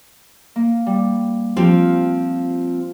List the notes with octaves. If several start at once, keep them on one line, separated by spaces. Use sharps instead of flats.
A#3
G3
F3 C4 F4 G4